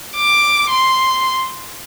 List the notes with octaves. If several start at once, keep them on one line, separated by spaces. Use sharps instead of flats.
D6
C6